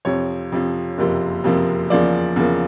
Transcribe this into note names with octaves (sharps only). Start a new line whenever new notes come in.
F2 C3 F3 C#5
F2 C3 F3
F#1 F2 C3 F3 A#3
F#1 F2 C3 F3 A#3
E2 C#3 F3 A#3 D5
E2 C#3 F3 A#3